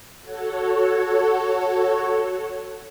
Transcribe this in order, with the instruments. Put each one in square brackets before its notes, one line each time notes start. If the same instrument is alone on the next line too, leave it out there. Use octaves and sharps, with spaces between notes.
[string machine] F#4 A4 C#5